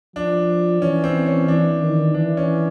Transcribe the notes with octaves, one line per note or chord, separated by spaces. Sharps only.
F3 D4
E3 C#4
C4
C#4
E3 D4
D#3
E3 D4
C#4